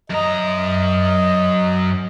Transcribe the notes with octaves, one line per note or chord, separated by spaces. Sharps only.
F#2 D#5 A#5